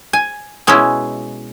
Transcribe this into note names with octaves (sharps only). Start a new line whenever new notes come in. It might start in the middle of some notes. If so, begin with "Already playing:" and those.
G#5
B2 G#3 C#4 E4